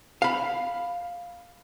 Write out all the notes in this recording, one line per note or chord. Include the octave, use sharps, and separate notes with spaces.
F5 B5